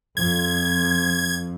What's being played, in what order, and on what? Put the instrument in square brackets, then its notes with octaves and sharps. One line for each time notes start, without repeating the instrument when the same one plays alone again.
[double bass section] F2 [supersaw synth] G#6